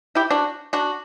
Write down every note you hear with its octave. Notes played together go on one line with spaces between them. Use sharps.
E4 G4
D4 F#4
D4 F#4